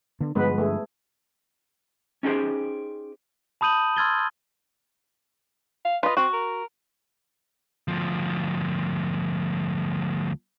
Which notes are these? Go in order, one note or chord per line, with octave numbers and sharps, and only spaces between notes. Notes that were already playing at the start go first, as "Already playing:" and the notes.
D3 B3 D4
G2 D3 F3 G#3 B3 B4
A3 G#4
C#4 D#4 G4 G#4 C5
A5 B5 D#6 G6 D#7 F#7
C6 E6 F6 G#6 A6 G7
F5
F4 B4 D#5
C4 F#4
A#4
D2 F3